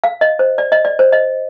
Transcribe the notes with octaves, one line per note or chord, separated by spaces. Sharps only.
F5
D#5
C5
D5
D#5
D5
C5
D#5